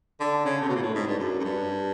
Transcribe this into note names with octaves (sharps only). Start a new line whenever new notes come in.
D3
C#3
C3
B2
A#2
A2
G#2
G2
F#2
F#2
G2